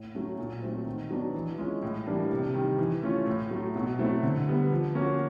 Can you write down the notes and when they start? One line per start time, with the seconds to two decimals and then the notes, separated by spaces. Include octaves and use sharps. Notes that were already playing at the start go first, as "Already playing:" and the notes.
Already playing: A2
0.14 F#3 A3 C#4
0.38 A#2
0.62 F#3 A3 C4
0.86 D#3
1.11 F#3 B3 D4
1.34 E3
1.58 G#3 C#4 F4
1.82 A2
2.07 E3 G3 A#3 D4
2.31 C3
2.54 D#3 G3
2.78 E3
3.03 A3 C#4 F4
3.26 A2
3.51 F#3 A3
3.75 B2
3.99 F#3 A3 C4 E4
4.23 D3
4.47 G3 B3
4.72 F3
4.95 A#3 C#4 F#4